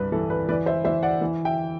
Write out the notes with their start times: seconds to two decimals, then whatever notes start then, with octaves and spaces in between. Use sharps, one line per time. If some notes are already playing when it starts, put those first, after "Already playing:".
Already playing: C2 G2 B4
0.12 E3 A4
0.30 B4
0.48 E3 B4 D5
0.66 C5 E5
0.85 E3 C5 E5
1.03 D5 F#5
1.21 E3
1.45 E5 G5